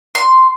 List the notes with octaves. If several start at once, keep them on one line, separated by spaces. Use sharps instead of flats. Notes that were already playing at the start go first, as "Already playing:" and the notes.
C6